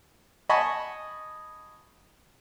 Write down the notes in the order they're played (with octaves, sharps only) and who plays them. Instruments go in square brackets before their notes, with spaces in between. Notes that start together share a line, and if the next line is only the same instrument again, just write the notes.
[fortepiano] D#5 F#5 G#5 A5 B5 C#6